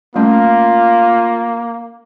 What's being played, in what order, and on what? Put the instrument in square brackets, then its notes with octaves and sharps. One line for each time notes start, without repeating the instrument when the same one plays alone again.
[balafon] G3 A3 C#4 [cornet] A#3 [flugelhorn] F4